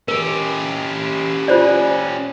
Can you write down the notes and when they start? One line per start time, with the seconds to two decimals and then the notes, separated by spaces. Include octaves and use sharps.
0.08 C#4 G4 A#4
1.48 F4 C5 D5